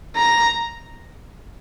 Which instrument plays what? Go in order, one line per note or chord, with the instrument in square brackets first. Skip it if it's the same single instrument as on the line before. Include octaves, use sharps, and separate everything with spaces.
[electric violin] A#5